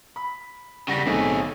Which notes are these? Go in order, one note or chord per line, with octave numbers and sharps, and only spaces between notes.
B5
C#3 G3 F#5 A#6 B6
B1 A3 C4 D#4 G#4